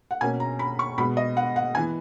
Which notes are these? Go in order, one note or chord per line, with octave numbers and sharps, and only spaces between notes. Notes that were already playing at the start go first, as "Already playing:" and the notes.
F#5
B2 A#3 C#4 G#5
A#5
B5
C#6
B2 G#3 B3 B5
D#5
F#5
F#5
E3 B3 G#5